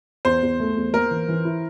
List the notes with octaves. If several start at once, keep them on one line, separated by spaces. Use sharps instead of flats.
E2 C5
E2
A3
E2
A#3 A#4
E3
E3
E4